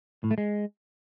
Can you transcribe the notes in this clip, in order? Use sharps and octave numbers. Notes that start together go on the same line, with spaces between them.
A2
A3
G#3